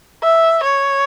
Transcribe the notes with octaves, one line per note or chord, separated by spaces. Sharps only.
E5
C#5